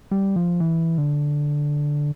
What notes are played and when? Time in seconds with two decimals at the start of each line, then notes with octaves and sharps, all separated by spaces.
0.11 G3
0.36 F3
0.60 E3
0.98 D3